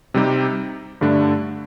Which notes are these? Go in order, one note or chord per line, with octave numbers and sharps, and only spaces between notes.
C3 G3 C4 D#4 G4
G2 D3 A3 D4